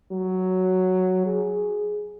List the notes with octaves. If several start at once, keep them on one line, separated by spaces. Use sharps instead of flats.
F#3
G#4